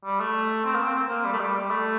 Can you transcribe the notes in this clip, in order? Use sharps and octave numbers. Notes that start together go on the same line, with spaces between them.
G3
A3
C4
A#3
C4
C4
A#3
G3
A3
G3
G3
A3